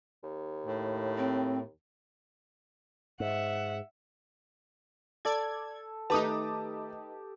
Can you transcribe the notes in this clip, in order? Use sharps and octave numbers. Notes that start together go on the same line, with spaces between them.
D#2
A2
C4
G#2 E5 F#5
A4 D5 G#6
D#3 A3 D#4 G4 B4 A5 D6 D#6